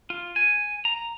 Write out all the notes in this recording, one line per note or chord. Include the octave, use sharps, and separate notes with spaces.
F4
G#5
A#5